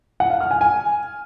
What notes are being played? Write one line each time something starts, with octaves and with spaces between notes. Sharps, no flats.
F#5
F5
F6
G#5
G#5